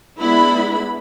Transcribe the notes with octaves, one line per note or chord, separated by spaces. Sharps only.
G#3 B3 D4 E4 B5